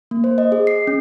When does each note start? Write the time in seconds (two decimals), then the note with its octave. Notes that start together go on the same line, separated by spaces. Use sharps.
0.11 A#3
0.24 C5
0.38 D#5
0.52 G#4
0.67 C7
0.87 C#4